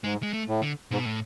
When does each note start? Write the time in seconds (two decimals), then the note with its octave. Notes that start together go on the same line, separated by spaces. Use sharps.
0.04 G#2 G#3
0.23 G#3
0.33 A3
0.48 A2
0.63 D3
0.91 G#2 B2
1.05 A2